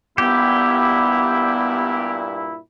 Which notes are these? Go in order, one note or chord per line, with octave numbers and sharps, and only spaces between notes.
G2 A#2 B3 E4 G4